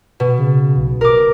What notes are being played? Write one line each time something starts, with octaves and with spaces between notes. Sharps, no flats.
B2
C#3
B1
D1 A#4 D6